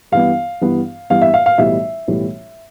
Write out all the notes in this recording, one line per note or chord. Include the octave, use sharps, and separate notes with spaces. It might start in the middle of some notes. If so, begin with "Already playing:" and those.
G2 E3 B3 F5
G2 E3 B3
G2 E3 B3 F5
E5
F5
F5
B1 A2 E3 G3 E5
B1 A2 E3 G3